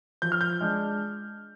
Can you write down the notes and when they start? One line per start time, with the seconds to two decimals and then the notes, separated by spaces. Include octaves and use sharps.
0.22 F3 G6
0.32 F6
0.41 G6
0.61 G#3 D4